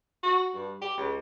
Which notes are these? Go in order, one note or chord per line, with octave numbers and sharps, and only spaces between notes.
F#4
G2
G4
C#2